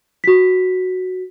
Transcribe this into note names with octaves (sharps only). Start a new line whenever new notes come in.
F#4 B6